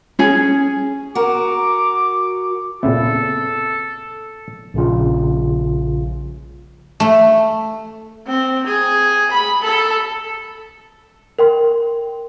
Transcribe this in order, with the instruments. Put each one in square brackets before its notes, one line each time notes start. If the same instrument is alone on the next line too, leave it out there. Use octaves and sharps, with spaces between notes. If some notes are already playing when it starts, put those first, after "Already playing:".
[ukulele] C#4 G#4
[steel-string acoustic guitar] F#4 A#4 [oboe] D6
[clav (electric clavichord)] A#2 C#3 E4 [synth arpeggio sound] B3 C4 [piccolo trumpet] A4
[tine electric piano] A#1 C#3 F4
[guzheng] A3
[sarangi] C4
G#4
B5
A4
[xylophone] A#4 G5 C6